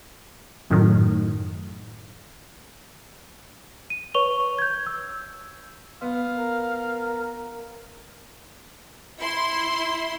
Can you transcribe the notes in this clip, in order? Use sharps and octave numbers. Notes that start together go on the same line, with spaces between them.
F#2 A2 D#3
D#7
B4 C#5 C#6 F7 G7
G6 G#6
E6
B3 F5
A#4
E4 C6